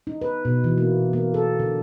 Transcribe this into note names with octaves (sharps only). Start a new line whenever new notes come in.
D#4
B4
B2
E3
A#3
A#3
A4
D3